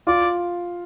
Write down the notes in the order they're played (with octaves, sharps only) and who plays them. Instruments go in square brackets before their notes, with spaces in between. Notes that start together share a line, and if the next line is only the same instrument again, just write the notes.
[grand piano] F4 [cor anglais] D5